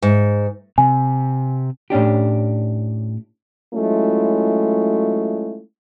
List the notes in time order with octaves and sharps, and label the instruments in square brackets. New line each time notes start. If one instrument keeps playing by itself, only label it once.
[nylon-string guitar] G#2
[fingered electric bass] C3 [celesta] G#5
[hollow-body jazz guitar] A2 C#4 D4 G4
[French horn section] F#3 G#3 A3 C#4 E4 F4